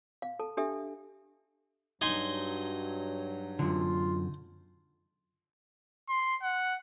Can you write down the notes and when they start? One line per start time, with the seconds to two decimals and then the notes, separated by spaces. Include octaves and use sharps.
0.22 F5
0.40 A4 A5
0.57 D4 G4 A4 E5
2.01 G2 F#3 D#4 G#5 C6
3.59 F#2 D3 F4
6.09 C6
6.42 F#5